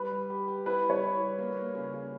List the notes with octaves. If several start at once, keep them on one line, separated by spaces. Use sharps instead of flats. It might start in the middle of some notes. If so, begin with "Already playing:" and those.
Already playing: G3 B4
G3
G4
G4
E4 B4
G3
C#5
E4
G3
A#3
A#3
C#3
C#3